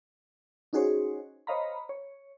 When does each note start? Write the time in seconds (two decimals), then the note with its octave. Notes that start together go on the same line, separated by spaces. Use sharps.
0.73 C#4 D#4 F#4 G#4 C5 C#5
1.47 C5 C#5 D#5 F5 A#5 B5
1.89 C#5